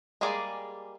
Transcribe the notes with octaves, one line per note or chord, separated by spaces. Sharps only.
G3 G#3 A#3 G#4 D5